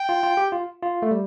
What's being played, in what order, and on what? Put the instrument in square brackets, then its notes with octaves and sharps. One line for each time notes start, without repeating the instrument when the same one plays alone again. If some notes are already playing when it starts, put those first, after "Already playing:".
Already playing: [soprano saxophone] G5
[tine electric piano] F4
F4
G4
F4
F4
A3
G3